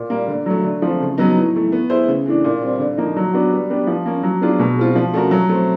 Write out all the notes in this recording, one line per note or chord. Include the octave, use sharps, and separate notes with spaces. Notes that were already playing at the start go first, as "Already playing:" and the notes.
Already playing: A#2
G3 A#3
D3
F#3 A3
D3
F3 A3 C4
C#3
F#3 B3 D#4
A2
E3 A3
B3
E4 G#4 C5
C#3
E3 A3 D4
A#2
G3 C4
D3
F3 A#3 D#4
F#3
B3 D4 F#4
G3
B3 D4 G4
F3
A#3 C#4
F#3
B3 D4 F4 G#4
B2
G#3 C4 F4
F3
A3 C#4 F#4 A#4
F#3
A3 C4